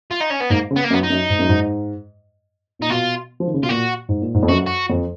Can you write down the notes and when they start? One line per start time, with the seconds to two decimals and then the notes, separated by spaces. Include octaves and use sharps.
0.11 F4
0.21 D#4
0.30 C#4
0.40 B3
0.50 G#2 A#3
0.71 C#3
0.76 B3
0.84 A#3
0.91 F#2
0.93 B3
1.03 D#4
1.10 F#2
1.30 G#2
1.39 F#2
1.49 G#2
2.79 A#2 D#4
2.90 B2 F4
3.40 F3
3.47 D#3
3.54 C#3
3.62 B2 F4
3.69 A#2 F#4
4.09 G#2
4.22 A#2
4.34 G#2
4.43 F2
4.49 F#2 F#4
4.67 F#4
4.90 F2